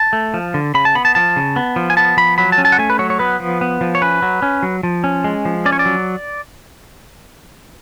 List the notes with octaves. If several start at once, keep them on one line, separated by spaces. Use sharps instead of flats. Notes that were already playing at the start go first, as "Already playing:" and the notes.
Already playing: A5
A3
F3
D3
C#3 B5
A5
B3 B5
A5
F3 A5
C#3
B3
F3
G#5
B3 A5
F3 B5
F#3 B5
A5
C#4
A5
F#5
A3 G#5
B4
F#3 C#5
C#5
B3 B4
F3
B3
F3
C#5
C#4 B4
F#3
C#4
F#3
F3
C#4
G#3
F3
C#4 D5
C#5
D5
F#3